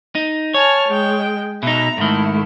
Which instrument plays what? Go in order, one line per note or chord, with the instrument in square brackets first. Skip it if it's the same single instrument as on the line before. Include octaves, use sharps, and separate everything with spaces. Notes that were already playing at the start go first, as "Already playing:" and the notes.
[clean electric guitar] D#4
[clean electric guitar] C#5 [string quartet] G#5 A5 F6
[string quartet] G#3 G5
[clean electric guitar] B2 D#4 [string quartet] E5 A#5
[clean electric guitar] G#2 D#3 [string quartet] A3 E4